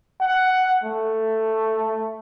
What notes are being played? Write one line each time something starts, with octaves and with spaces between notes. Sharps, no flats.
F#5
A3